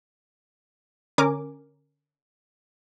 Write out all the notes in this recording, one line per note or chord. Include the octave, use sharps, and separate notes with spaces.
D3 C#4 A#4 G#5 D6